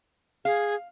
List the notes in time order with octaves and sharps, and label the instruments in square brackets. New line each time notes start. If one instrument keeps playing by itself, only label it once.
[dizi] G#4 [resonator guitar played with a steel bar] F5